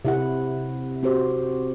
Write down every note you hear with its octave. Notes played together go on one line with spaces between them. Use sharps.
C3 E4 F#5
C4 F#4 G4 C5